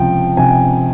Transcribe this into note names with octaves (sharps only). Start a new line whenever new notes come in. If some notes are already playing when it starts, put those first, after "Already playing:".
Already playing: C#2 C3 F3 G5
C3 F3 G#5